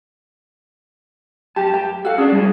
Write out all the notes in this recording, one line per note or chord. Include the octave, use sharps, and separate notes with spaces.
F#2 G4 A5
G4 A5
F#4 A4 F5
C#4 D4 G#4
G3 E4